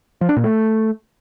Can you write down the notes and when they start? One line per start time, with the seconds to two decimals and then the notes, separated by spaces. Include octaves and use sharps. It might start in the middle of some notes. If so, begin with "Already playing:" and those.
0.21 F3
0.29 D4
0.36 A#2
0.44 A3